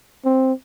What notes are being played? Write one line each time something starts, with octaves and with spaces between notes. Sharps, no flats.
C4